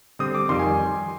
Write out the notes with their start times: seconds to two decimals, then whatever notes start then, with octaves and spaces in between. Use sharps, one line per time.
0.19 D3 G3 C4 D#6
0.35 D6
0.49 F2 D#3 G3 C6
0.59 G#5